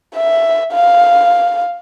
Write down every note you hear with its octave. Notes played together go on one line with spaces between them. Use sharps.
E5
F5